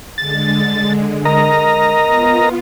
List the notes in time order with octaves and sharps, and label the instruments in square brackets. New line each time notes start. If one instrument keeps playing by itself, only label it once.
[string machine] D3 G#3 [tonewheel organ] A6
[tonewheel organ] A#4 D#5 A#5
[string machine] B3 F4